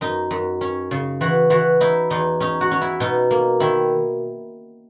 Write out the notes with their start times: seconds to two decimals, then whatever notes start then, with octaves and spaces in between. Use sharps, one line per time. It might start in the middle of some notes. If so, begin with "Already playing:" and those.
0.01 F#2 D#4
0.31 F#2
0.61 C#4
0.91 C#3
1.21 E3 F#4
1.50 E3 F#4
1.81 D#4 E4
2.10 E2 D#4
2.40 C#4 D#4
2.61 F#4
2.71 C#4
2.81 E4
3.00 B2 D#4
3.31 A#3
3.60 D#3 E4